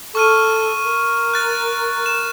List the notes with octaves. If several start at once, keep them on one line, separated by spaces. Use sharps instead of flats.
A4 C#6 F6 D#7
A#4
F#6 A6
A#4 E7